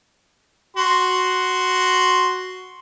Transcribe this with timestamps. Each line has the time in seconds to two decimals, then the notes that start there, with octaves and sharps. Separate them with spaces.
0.77 F#4 C6